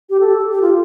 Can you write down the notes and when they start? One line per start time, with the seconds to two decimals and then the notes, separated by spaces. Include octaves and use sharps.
0.10 G4
0.20 A4
0.51 G4
0.62 F4